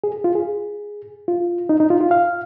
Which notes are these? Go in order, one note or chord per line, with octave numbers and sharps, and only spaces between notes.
G#4
F4
G#4
F4
D#4
D#4
F4
F4
F5